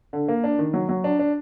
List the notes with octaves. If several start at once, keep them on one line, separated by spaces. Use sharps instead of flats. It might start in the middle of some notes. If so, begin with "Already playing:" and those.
D3
A#3
D4
D#3
F#3
F#3
D4
D4